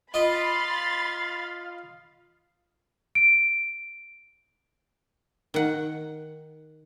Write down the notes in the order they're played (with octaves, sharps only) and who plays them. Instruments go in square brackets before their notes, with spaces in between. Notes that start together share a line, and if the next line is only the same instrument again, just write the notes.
[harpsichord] F4 D#5 [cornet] F5 [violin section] B5 C6 A6
[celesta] D7
[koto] D#3 F#5